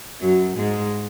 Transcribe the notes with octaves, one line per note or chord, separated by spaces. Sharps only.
F#2 F#3
G#2 G#3